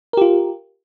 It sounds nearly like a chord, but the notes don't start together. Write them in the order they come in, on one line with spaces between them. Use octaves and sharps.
A#4 G4 F4